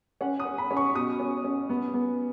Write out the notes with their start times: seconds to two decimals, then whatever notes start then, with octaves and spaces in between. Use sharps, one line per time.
0.21 C#4 F#5
0.40 D#6
0.45 C#4
0.58 B5
0.71 C#4
0.77 C#6
0.95 B2 D#6
1.20 C#4
1.44 C#4
1.69 B3
1.94 B3